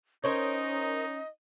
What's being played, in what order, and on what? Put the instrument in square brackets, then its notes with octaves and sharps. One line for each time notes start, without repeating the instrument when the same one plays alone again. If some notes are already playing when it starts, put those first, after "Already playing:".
[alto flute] C#4 [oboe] D#4 [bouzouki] A#4 C5 C#5 [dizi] D#5